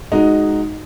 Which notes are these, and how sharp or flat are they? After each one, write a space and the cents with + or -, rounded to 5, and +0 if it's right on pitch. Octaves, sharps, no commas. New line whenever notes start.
G#3 +0 D#4 -5 F#4 +0